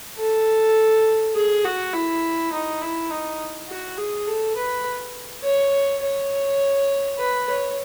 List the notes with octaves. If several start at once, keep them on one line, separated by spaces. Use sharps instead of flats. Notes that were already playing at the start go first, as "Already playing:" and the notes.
A4
G#4
F#4
E4
D#4
E4
D#4
F#4
G#4
A4
B4
C#5
C#5
B4
C#5